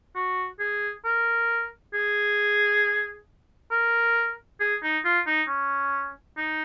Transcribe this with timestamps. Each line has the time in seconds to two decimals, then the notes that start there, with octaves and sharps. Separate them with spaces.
0.15 F#4
0.60 G#4
1.05 A#4
1.94 G#4
3.71 A#4
4.60 G#4
4.83 D#4
5.05 F4
5.27 D#4
5.48 C#4
6.37 D#4